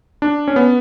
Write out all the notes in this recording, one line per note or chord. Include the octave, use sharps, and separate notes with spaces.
D4
C#4
B3